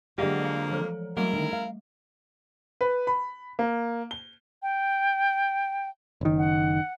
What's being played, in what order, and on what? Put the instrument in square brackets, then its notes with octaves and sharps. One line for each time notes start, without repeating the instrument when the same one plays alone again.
[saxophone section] F2 A#3 [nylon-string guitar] D3 G#3 G4 [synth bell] F#3 D5 F#5
[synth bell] F5 A#5
E3 F3 A4
[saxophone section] C#3 E4 A#4 [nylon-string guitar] F#3 [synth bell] G3 A3
[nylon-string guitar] D3 D#3
F5
[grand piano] B4
B5
A#3
G7
[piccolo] G5
[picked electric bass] F#1 D#3
[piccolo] F#5